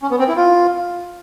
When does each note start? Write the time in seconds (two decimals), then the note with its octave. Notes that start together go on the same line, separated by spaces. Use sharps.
0.02 C#4
0.11 B3
0.19 C4
0.28 E4
0.36 F4